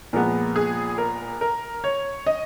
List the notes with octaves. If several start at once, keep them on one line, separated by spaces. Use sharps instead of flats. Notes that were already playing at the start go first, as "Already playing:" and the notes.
A#2 F3 G#3 B3 A#4
G#4
A#4
A#4
C#5
D#5